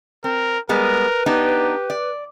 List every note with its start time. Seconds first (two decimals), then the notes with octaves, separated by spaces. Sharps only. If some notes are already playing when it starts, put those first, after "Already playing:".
0.24 C4 A#4
0.69 G3 G#3 B3 A#4 B4
1.26 B3 D4 D#4 G4
1.90 D5